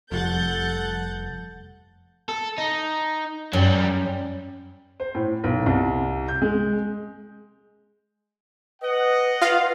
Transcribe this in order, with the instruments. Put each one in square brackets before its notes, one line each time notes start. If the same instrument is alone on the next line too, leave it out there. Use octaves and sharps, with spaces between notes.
[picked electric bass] F1 [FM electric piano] F2 F3 G3 [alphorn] A4 [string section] F#5 G6 A6
[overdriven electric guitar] A4
D#4
[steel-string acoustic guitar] F#2 [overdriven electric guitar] F#3 G3
[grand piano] C5
A2
B1
C2
G6
G#3
[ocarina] B4 [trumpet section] D#5 F#5
[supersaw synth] F4 F5